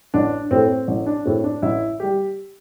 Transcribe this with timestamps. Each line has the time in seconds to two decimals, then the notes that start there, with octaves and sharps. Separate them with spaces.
0.14 A1 D4
0.51 A2 A3 C4
0.88 A1
1.06 D4
1.25 A2 A3 C4
1.44 D4
1.62 A1 E4
2.00 G3 G4